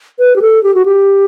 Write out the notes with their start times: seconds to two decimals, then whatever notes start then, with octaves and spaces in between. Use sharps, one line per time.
0.19 B4
0.36 G4
0.42 A4
0.63 G4
0.74 F#4
0.86 G4